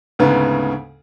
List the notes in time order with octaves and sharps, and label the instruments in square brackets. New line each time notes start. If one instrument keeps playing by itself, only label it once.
[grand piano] D2 G#2 C#3 B3